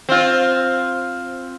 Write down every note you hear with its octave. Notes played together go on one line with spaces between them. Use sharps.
C4 F4